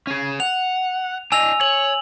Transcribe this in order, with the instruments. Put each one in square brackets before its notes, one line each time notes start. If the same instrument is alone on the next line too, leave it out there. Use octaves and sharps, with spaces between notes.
[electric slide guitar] C#4 G#4
[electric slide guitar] F#5 [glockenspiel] F7
[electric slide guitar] D4 D#5 [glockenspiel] G#5 E6 F7
[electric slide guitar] C#5 [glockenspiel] F#7